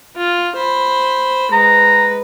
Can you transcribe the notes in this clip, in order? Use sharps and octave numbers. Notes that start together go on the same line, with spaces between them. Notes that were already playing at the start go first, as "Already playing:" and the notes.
F4
C5 B5
G#3 B4 A#5